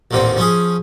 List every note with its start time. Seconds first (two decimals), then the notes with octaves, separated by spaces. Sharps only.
0.11 A1 D#2 A#2 D3 C4
0.37 F3 C#4 G#4